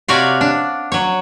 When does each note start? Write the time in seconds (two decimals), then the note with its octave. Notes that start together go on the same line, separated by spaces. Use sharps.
0.08 C3 F#4 C#5 D5 F5
0.41 D4
0.92 F#3 C#5